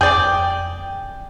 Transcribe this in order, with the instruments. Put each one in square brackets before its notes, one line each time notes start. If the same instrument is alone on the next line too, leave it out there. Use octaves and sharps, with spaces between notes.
[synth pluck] F2 [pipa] G#4 D5 [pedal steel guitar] G5